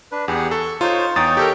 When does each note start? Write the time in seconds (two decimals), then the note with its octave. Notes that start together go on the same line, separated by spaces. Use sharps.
0.12 D4 B4
0.28 E2 G4 G#4 F#5
0.51 A4 C#6
0.81 D#4 F4 C5 C#5
1.16 E2 D#4 C#5 G5 D#6 A6
1.37 G4 A4 A#4